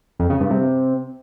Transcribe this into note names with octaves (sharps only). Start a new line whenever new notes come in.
F2
C#3
G2
C3